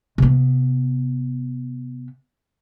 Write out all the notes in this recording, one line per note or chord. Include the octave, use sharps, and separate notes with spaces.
C3 B3